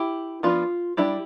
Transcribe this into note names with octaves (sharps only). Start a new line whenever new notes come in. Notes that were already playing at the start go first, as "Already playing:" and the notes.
Already playing: E4 G4
F3 B3 D4 F4
G3 D4 E4 G4